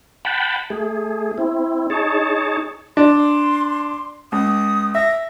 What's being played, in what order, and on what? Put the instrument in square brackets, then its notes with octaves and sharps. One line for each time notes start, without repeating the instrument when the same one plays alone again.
[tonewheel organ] F#5 G5 A5 B5
A3 G#4
C4 E4
D#4 G#4 C#5 A5
[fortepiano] D4 [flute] C6
[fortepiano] C#2 [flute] D#6
[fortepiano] E5 [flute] A#6